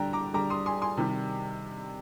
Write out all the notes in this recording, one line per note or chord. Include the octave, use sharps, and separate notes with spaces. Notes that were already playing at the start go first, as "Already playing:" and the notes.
Already playing: D3 G3 G5 A#5
A#5 D6
D3 G3 A#5 D6
C6 D#6
G#5 C6
G#5 C6
C3 D#3 G3